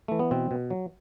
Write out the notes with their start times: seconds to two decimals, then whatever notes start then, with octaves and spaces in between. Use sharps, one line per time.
0.08 E3 A3
0.19 B3
0.31 B2 C4
0.51 B2
0.70 F#3